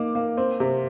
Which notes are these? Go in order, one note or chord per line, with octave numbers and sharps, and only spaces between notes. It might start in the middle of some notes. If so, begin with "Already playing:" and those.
Already playing: A#3 D#4 D6
A#3
C4
C3